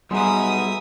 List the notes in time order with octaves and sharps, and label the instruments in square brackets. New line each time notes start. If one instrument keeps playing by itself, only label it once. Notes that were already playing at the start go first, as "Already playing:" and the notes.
[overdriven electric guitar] B1 B2 [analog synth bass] G3 [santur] G#3 A#5 [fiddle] E5 D#6